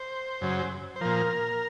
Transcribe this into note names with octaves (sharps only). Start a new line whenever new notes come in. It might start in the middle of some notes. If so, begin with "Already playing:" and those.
Already playing: C5
F#2 C#3 F#3
C5
A#2 F3 A#4